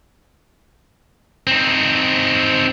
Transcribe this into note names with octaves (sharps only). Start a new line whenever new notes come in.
C4 D#4